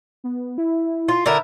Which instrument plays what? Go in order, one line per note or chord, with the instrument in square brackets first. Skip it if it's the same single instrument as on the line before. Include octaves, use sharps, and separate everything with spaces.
[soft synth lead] B3
E4
[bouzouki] F4
D3 E4 A#4